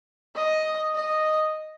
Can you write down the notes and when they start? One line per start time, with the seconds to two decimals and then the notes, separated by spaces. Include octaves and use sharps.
0.36 D#5
0.95 D#5